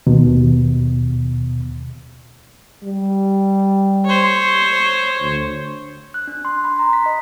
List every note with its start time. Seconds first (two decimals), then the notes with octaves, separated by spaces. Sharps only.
0.07 D#2 B2
2.83 G3
4.05 C5 C#5
5.20 D2
6.14 F#6
6.27 D4
6.45 C6
6.64 B5
6.79 A#5
6.93 B6
7.06 D#5